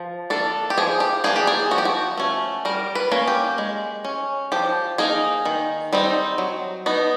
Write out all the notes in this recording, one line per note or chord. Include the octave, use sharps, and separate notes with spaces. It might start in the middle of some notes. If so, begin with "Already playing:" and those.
Already playing: F3
A#3 D4 A4
G4
F3 G#4
G4
A#3 D4 G#4
G4
G#4
F3 F#4
G4
F#4
A3 C#4
G3 A#4
B4
A#3 C#4
G4
G#3
C#4
F3 G4
A#3 D#4 G#4
D#3
G3 C4 D#4
F#3
B3 D#4